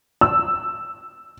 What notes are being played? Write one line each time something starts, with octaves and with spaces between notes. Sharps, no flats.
E6